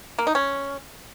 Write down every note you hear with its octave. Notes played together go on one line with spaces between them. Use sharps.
A#3
D#4
C#4